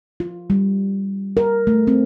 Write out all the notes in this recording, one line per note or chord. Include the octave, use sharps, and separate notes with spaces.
F4
G3
A#4
A3
C4